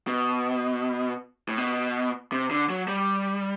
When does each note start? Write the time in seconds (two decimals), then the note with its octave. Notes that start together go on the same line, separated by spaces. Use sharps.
0.08 B2
1.49 A2
1.58 B2
2.32 C3
2.51 D3
2.70 F#3
2.88 G3